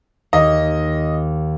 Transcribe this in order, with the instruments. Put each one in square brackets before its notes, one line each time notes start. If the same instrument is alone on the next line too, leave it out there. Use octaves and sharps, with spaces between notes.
[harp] D#2 [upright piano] D#5